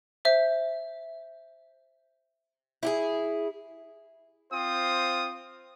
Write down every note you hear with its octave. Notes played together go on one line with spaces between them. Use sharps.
C5 E5
E4 G4 G#4
C4 F4 C5 D#6